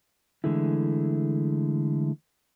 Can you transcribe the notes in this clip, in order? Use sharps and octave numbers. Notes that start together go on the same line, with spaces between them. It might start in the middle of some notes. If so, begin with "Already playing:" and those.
D3 E3 G#3 A3 E4